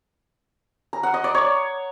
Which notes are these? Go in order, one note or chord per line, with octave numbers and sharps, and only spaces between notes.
A#5
F#5
D#5
D5
C#5